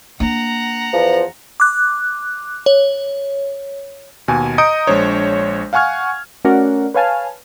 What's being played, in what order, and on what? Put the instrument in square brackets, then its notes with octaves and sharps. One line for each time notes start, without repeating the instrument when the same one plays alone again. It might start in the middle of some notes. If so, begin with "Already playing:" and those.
[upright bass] A#3 D4 [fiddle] F#5 A#5
[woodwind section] E2 F3
[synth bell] D6 F#6
C#5
[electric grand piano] D#2 B2 G#5
D#5 A#5 D#6 G6 C#7 D7
A#1 G#3 D4 C5 C#5
F5 F#5 G#5 C#6 F6 G#6
[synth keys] A3 C#4 F#4 A#4 D5 F#5
B4 C#5 F5 G#5 A5 F6